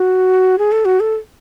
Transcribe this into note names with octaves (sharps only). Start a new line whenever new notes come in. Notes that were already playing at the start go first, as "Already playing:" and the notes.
Already playing: F#4
G#4
A4
F#4
A4